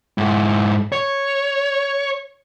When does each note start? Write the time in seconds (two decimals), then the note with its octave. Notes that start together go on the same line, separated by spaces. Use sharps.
0.18 G#2 E4
0.92 C#5